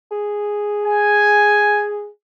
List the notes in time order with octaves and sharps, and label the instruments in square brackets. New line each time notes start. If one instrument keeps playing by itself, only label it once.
[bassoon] G#4
[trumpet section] G#5